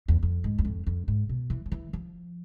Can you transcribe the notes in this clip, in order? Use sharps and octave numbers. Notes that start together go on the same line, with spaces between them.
E2
F2
G#2
E2
F2
F2
G#2
B2
E3
F3
E3
F3